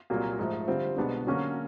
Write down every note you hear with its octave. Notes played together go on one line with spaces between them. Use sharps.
C2 A#2 F#3 A#3
G#2 F3 A3
D3 G3 C4 F4
C2 B2 G#3 B3 D4
D3 F#3 A#3 C#4 F#4